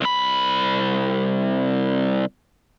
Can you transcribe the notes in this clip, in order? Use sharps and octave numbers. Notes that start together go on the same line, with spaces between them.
C2 B5